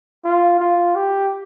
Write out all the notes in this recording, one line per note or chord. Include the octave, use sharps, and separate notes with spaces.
F4
F4
G4